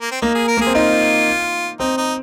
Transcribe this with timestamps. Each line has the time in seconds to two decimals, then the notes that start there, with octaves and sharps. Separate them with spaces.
0.01 A#3
0.11 C4
0.22 A#3 D#4
0.35 G#4
0.48 A#4
0.57 A#3
0.61 G#4
0.66 C4
0.75 D#4 F4
1.80 C4 D#4
1.98 D#4